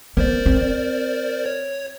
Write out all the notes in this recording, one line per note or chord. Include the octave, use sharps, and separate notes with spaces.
B3 A#4 C5 D5
C4
C#5